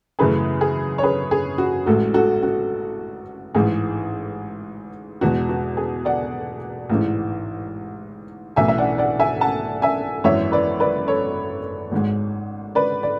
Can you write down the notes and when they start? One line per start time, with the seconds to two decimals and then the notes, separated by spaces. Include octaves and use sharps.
0.19 F#2 C#3 E3 A3 G#4 B4
0.61 G#4
0.98 C#5
1.03 G#4 B4
1.31 G#4
1.58 F#4
1.86 A1 A2 G#3 F#4 A4
2.14 F#4 A4
2.43 F#4
3.54 A1 G#2 E3 G#4
5.21 E2 B2 G#3 F#4
5.49 F#4
5.77 G#4
6.05 D5 F#5
6.90 A1 G#2 E3
8.56 B1 A2 E3 E5 G#5
8.68 E5
8.78 D5 F#5
8.98 D5 F#5
9.20 E5 G#5
9.41 F#5 A5
9.82 E5 G#5
10.24 G#1 F#2 E3 C#5 E5
10.52 B4 D5
10.80 B4 D5
11.08 A4 C#5
11.92 G#1 G#2 G#3
12.75 B4 D5
13.03 D5